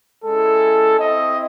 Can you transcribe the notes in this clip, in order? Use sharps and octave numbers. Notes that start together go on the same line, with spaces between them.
G#3 C#4 E4 A4
C4 E4 D#5